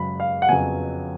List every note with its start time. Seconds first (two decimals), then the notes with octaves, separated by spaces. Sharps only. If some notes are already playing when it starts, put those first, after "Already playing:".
Already playing: F#2 C#3 G#3 B5
0.20 F5
0.42 F#5
0.49 F2 C#3 F#3 B3 G#5